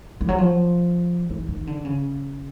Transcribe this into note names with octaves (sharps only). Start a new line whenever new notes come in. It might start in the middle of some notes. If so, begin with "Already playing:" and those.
F3
F#3
F3
E3
D#3
D3
C#3